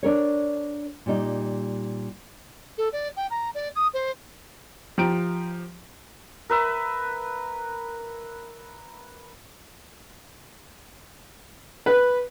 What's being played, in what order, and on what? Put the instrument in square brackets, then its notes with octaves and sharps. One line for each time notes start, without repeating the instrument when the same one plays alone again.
[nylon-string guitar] D4 A#4 C#5
A#2 G3 D#4
[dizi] A4
D5
G5
A#5
D5
D#6
C5
[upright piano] F3 G4 A#5 D7
[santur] A#4 B4 E5
[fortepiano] B4